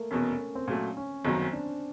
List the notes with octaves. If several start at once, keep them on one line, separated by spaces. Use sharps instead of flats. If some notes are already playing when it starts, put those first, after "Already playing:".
Already playing: A3 A#3
F1 E2 B2 C#4
C4
A#2 F#3 A3 C#4
C#4
G1 F#2 D#3 F#3 C4
D4